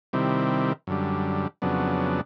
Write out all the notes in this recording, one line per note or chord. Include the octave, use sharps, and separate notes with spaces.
C3 D#3 G3 C4 E4
F#2 D3 G3
F2 C#3 F#3 B3 D4